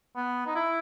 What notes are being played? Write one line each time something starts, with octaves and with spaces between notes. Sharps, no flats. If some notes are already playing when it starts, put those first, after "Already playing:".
B3
D#4
E4